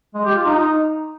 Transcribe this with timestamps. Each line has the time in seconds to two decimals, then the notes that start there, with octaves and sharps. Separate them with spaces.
0.14 G#3
0.25 G4
0.35 F4
0.46 D#4